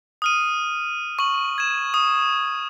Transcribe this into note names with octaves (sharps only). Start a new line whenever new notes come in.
D#6 F6 D#7
C#6 F#7
G#6 E7
D#6